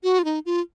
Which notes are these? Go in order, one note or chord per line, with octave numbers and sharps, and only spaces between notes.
F#4
F4
D#4
F4